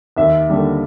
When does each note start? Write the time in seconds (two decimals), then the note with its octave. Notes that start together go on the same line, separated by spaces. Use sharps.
0.17 D#2 E5
0.49 D3 G3 A#3